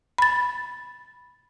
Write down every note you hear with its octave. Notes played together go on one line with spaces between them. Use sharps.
B5 A6